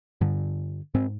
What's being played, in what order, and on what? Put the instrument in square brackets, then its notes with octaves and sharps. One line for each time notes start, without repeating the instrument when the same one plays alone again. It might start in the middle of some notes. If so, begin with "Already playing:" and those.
[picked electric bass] G2 D3
G#2 C4